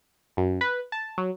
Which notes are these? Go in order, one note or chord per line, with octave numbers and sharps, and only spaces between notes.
F#2
B4
A5
F#3